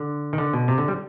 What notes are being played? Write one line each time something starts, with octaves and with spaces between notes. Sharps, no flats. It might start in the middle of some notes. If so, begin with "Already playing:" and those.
Already playing: D3
D#3
D3
B2
C3
D3
G3